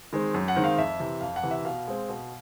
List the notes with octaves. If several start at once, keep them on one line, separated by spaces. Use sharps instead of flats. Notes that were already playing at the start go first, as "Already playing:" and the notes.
D#3 G#3 C4
F#2
F#5
D#3 G#3 C4
F5
F2 E5
C3 E3
F2 F5
F#5
C3 E3
E5
B2 F5
G#3 C4
B2